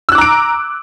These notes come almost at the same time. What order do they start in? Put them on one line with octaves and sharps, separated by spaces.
E6 F#6 D6 A#5 D7